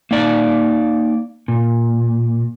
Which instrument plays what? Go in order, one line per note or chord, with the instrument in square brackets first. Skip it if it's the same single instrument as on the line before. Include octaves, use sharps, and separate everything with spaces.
[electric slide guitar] A#3 D#4 D5
A#2